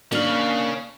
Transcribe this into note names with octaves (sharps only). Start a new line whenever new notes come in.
A#3 C#4 D4 F5